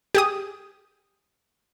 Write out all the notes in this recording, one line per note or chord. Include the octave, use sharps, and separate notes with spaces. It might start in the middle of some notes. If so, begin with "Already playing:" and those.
G4 G#4 D#6